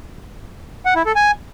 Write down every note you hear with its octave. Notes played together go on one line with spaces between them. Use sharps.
F#5
E4
A4
G#5